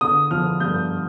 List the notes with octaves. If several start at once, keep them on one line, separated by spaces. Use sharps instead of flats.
D3 D#6
F3 F6
G2 G6